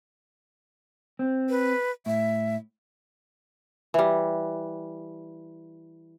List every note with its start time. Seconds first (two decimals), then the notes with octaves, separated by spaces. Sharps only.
1.19 C4
1.49 B4
2.06 A2 E5
3.94 E3 G3